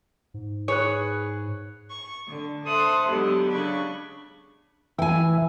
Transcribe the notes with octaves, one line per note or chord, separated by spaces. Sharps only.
G#2
G#4 B4 C#5 F#6
C#6
D3
A4 C5 E5 C6 D#6 F#6
D3 F#3 G#3 B3 G4
C#3 D4 B5 C#6
E3 G5 G#5